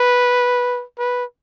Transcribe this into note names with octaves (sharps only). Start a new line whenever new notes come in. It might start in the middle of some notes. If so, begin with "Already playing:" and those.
Already playing: B4
B4